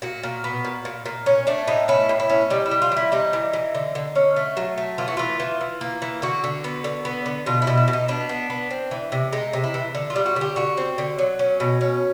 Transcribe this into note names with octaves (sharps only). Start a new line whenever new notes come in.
A#2 F#4
A#2
B3
A#2
A#2
A#2
C#4
A3 D4
A2 D#4
C#4 E4
A2
E4
C#4
G3 D#4
E4
G3
F4
E3 E4
G3 D#4
E3
E3
D3
D3
C#4
A3
F#3
A3
E3 F4
F#4
E3 F4
E3
E3
A#3
E3
D3 F#4
D3
B3
D3
B3
D3
B2 F4
E4
B2
E4
B2
D#4
B3 D4
B3
B3
C4
E3
C3
G#3 D#4
C3
E4
E3
D3
F4
G3
F#4
D3 G4
D3 F#4
C4
D3
F#3
C#4
B2
C#4